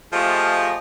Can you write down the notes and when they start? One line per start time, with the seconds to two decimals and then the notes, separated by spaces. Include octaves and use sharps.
0.13 F3 A3 F4 G4 G#4 D#5